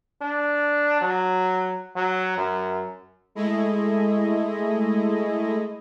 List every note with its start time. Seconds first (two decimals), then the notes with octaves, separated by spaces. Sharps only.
0.21 D4
1.01 F#3
1.96 F#3
2.38 F#2
3.35 G#3 A3 E4 D#5